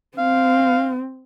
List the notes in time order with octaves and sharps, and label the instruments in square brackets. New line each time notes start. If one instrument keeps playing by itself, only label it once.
[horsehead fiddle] C4 [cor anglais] F5